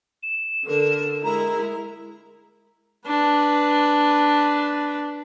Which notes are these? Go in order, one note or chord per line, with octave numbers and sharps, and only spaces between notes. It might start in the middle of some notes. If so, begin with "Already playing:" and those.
E7
D3 A#4
G#3 E4 A#4 A#5
D4 B4